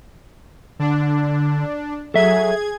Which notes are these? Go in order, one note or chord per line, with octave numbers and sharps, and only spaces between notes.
D3 D4
F#3 G#4 A4 E5 G#6